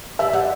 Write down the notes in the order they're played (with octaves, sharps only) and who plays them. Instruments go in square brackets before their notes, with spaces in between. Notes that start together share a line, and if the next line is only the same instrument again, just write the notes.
[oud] G3 [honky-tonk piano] E5
[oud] G3 [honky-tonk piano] F#5